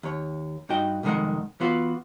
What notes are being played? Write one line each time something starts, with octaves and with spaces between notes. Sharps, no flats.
D#2 C#5
G2 D#4 F#4 G5
C2 F2 D#3 G#3 A#4 F#5
E3 B3 F4 F#4